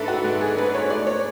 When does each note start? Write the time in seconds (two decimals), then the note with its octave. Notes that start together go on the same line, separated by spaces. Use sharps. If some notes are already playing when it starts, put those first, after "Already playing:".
Already playing: G#2 D4 A4 B4 E5
0.08 F#4
0.24 G#2
0.41 G#4
0.58 D4 B4
0.75 C#5
0.90 A3 D5
1.07 C#5